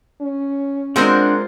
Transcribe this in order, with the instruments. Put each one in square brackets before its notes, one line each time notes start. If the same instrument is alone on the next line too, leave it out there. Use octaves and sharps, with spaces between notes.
[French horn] C#4
[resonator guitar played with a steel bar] G#3 C4 A#4 [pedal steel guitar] D4 F#5 G5 [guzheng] F4 C5